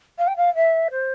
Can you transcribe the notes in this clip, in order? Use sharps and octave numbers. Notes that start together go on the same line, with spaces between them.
F5
G5
F5
E5
C5